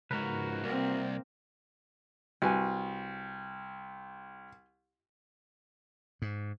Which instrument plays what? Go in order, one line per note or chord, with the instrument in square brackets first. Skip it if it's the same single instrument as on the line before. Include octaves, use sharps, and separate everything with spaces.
[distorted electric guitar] C#2 G#2 [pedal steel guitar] F#4 A#4 B4
[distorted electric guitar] C2 [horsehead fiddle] A#3 C4
[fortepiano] C2 [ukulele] F#4 B4 G#5
[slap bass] G#2